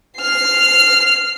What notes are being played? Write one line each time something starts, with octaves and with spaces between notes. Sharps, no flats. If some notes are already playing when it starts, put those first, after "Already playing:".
F6 C7